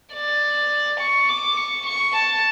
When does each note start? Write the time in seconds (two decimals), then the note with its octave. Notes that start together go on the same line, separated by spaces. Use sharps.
0.14 D5
1.00 C#6
1.29 D6
1.57 C#6
1.86 C#6
2.15 A5